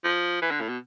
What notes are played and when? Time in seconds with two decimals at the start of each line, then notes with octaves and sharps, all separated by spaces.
0.04 F3
0.42 E3
0.51 D3
0.61 A2
0.69 B2